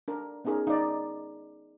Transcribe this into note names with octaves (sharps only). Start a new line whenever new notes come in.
D4 A#4
B3 C#4 D#4 G#4 A#4
D#4 D5